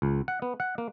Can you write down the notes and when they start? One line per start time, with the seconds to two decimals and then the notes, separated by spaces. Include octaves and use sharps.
0.02 C#2
0.28 F#5
0.42 B3
0.60 F#5
0.78 A#3